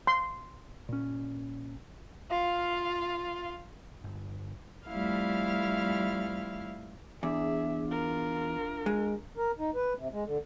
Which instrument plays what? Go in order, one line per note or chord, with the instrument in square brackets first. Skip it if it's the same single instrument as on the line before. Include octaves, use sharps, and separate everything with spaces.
[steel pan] C6
[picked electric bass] A#2 C#4
[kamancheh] F4 F5
[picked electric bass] G1
[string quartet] F2 G3 A3 E4 F5 F6
[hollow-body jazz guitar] E2 [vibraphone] D4 [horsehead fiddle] G#4 E5
[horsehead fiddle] F4 A#4
[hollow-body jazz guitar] G#3
[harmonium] A#4
D#4
B4
C3
G#3
D3